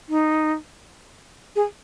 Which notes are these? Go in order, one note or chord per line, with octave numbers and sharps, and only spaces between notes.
D#4
G#4